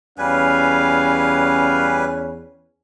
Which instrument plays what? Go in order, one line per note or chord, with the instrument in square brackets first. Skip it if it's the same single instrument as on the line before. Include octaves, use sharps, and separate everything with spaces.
[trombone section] E2 C#4 [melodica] G3 B4 G#5 [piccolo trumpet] F5